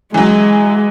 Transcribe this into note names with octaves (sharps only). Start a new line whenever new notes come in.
E3 F#3 G#3